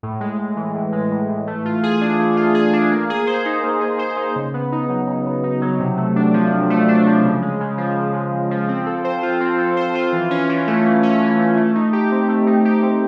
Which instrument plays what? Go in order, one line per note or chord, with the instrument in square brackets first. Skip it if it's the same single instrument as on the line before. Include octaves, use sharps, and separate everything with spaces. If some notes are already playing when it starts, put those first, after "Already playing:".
[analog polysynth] A2
G#3
A2
E3
A2
G#3
A2
E3
A3
F4
G#4
D4
A3
F4
G#4
D4
A#3
G#4
C5
D#4
A#3
G#4
C5
D#4
C#3
B3
D#4
F#3
C#3
B3
D#4
F#3
C3
A3
D4
F3
C3
A3
D4
F3
C#3
G#3
C#3
F3
C#3
G#3
C#3
F3
C4
A4
C5
F4
C4
A4
C5
F4
E3
C#4
E3
A3
E3
C#4
E3
A3
A3
D#4
G4
C4
A3
D#4
G4
C4